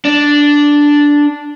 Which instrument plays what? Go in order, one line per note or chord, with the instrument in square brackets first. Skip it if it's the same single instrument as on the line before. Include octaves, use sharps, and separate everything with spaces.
[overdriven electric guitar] D4